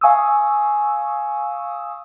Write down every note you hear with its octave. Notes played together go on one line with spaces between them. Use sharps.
F5 G#5 C#6 D#6 E6